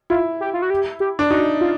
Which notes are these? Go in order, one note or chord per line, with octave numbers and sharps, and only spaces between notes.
E4 F4
G4
F4
F#4
G4
G4
D4
D#4 F#4
F4